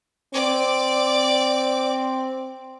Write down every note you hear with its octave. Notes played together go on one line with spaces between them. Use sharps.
C4 D5 D6